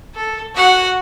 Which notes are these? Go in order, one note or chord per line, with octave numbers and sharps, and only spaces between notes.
A4
F#4 F#5